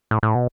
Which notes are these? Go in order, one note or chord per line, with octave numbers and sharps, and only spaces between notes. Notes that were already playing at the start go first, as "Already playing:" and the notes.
A2
A2
B2